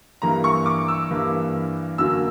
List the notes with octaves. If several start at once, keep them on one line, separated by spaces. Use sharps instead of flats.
G2 E3 A#3 A#5
C#6
D6
E6
G2 E3 A#3
F#2 D3 F#3 A#3 E6